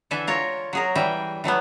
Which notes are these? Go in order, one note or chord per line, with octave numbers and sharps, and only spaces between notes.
D3 E3 A4 E5 G#5
F4 A#4 C#5
F#3 G#4 A#4
E3 G3 E5 G5
E3 F#3 A3 B3